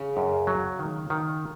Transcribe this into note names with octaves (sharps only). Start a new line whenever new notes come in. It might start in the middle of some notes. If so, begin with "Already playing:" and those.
Already playing: C#3
F#2
F#3
D#3
D#3